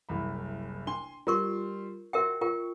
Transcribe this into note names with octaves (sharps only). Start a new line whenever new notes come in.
F#1 C2 B5
D4 G#5 C6 G7
G3 F4 A#4 C6 C#6
F#4 A#4 E5 G5 C6
F4 A#4 G5 C#6